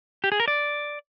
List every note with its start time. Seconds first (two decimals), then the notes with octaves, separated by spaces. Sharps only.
0.24 G4
0.32 G#4
0.40 A#4
0.48 D5